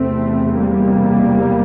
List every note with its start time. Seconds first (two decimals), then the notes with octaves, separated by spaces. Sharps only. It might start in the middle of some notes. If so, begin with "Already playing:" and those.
Already playing: E2 C3 A3 C4
0.59 G3 A#3